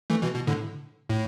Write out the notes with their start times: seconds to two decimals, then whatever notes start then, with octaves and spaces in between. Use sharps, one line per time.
0.10 E3 A3
0.22 B2 E3
0.35 B2
0.47 A2 D3
1.09 A2